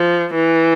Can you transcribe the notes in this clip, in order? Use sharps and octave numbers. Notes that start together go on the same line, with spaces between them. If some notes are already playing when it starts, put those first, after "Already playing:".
Already playing: F3
E3